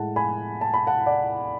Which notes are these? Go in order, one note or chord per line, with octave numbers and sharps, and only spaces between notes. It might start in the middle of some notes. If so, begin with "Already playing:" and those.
Already playing: A2 G#3 F#5 A5
G#5 B5
A5
B5
F#5 A5
D5 F#5